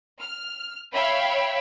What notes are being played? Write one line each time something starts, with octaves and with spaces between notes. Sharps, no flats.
F6
C#5 E5 F5 G5 B5